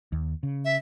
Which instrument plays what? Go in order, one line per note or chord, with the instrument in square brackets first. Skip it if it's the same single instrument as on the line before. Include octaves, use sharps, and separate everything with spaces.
[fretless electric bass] D#2
C#3
[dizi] E5